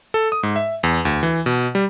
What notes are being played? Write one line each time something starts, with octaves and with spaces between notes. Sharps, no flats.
A4
D#6
G#2
E5
E2
D2
E3
B2
G3